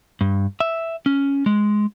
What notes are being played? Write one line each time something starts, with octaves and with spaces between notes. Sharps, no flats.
G2
E5
C#4
G#3